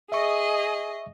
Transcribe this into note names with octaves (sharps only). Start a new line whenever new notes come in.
G#4 D#5 E5 C#6